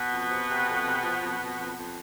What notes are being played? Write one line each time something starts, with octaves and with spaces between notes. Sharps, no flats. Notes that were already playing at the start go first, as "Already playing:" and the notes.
Already playing: B2 B3
F2
C3
C3
F2
C3
F3
F2
F2
F2
F2